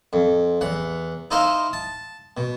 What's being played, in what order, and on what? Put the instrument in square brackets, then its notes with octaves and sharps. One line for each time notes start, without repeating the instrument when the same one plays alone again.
[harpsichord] F2
E2 F#5
D#4 E4 C5 D#5 F5
A5
B2